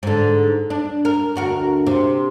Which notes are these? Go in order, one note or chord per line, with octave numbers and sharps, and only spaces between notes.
G#2 D3
D4
A#4
D2 F#4 A#4
C3